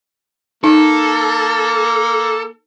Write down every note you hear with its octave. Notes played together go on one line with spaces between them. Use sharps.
A#3 D#4 A4